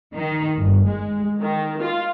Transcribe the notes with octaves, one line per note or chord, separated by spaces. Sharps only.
D#3
G1
G#3
D#3
F4